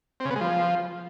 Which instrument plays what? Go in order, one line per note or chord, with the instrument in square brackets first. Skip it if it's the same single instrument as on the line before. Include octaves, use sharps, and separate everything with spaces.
[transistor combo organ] C4
C#3
B3
G#3
F3